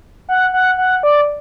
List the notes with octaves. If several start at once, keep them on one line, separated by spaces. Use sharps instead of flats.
F#5
F#5
F#5
D5